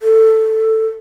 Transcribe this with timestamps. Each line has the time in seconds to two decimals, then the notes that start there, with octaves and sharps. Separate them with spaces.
0.01 A4